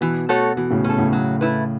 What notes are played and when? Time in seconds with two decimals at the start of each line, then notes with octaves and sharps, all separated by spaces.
0.01 B2 E3
0.29 A3 F#4 A4 C#5
0.56 B2 E3
0.71 A2 C#3
0.84 B2 C#4 A4
0.98 A2 C#3
1.13 F#3
1.41 A3 E4 B4